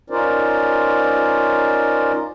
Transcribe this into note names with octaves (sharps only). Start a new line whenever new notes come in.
C#4 D#4 F4 A#4 C5 D5